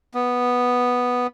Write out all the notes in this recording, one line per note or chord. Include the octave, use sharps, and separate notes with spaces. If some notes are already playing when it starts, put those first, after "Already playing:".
B3